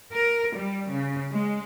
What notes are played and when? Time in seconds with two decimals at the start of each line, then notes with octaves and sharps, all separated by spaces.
0.12 A#4
0.55 G3
0.90 C#3
1.32 G#3